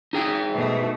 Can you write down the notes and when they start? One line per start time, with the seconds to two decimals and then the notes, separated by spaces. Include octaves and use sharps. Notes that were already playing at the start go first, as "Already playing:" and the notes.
0.13 D#4 G#4 G5
0.54 B2 A3